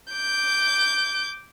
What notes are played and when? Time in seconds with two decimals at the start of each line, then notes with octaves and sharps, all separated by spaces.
0.13 D6 G6